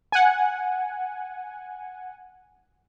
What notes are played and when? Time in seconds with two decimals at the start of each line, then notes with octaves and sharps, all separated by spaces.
0.12 F#5 G#5